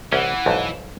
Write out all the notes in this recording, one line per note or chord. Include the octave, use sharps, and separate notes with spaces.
C2 E3 C#4 F#5
B1 F2 G#2